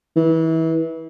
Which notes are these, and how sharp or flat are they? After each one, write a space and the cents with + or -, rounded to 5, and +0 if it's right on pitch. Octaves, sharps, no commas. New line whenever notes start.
E3 -30